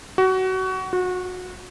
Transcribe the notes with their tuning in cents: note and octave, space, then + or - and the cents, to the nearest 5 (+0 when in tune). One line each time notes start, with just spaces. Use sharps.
F#4 +25
F#4 -25